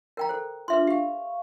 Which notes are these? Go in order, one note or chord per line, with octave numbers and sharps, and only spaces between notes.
A#4 G5 A#5
A4 C5
D4 F4 B4 E5 C6
G4 F5 C#6